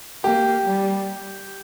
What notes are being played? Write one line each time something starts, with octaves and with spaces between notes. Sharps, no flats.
A#3 G4
G3